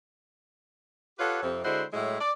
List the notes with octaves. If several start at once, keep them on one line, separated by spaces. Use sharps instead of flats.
F4 G4 A4 B4 C#5 F#5
F2 C3 C4
D3 G#3 E4 F#4 C5
A2 F#3 G#3 E4
D5